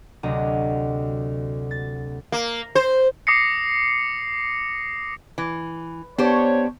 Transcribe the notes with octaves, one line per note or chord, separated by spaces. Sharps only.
D2 C3 F#3 D#5
A6
A#3
C5
D6 D#6 A#6 C7 C#7
E3
B3 D4 G4 C5 C#5